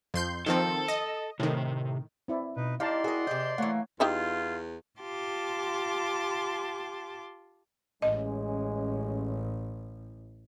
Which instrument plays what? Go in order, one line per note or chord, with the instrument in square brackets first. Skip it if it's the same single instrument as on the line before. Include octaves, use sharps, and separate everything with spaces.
[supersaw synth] F2 C6 G6
[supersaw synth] D#3 F3 C4 [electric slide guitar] A4 A5
[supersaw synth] D#5
[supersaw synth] A2 D#3 [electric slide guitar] C3
[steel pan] C4 E4 D5
[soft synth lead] B2 [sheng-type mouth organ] D#4 B4
[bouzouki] D#4 G4 [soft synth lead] E4 [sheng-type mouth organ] D5 C6 [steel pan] F5 A5
[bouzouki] F#4 D#5 [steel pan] G#4 A#4
[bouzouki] C3 D#5 [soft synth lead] G6
[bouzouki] E3 A#3 [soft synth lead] A3 [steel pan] C#5 F#5
[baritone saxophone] E2 [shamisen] D#4 G4 E5 [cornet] F4
[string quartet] F4 G4 A5 C6 D6
[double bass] A1 [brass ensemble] G#3 C#4 [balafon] D#5